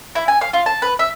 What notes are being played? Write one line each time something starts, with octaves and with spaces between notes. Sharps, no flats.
E4
G#5
F5
F4
A5
B4
E5